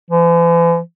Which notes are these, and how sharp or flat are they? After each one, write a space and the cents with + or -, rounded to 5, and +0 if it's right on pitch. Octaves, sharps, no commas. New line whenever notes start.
E3 +45